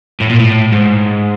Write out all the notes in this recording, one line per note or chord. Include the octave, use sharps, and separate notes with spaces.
A2
A#2
A2
G#2